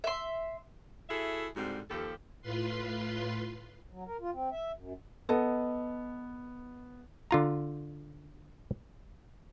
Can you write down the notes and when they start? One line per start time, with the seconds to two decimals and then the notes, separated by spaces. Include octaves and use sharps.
0.04 E5 C6
1.09 E4 F#4 G#4 A4 E5
1.56 G#2 D3 G3 C4 F#4
1.90 D#2 F3 G4 A4
2.42 A2 F4 B4 C6
3.92 F#3
4.07 A#4
4.21 F4
4.33 C4
4.52 E5
4.76 F#2
5.29 B3 A4 D#5
7.31 D3 F4 A#5